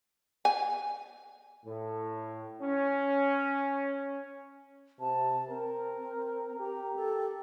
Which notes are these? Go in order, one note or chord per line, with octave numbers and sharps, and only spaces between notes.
G#5
A2
C#4
C3 A5
C4 A#4
G4 A#5
A4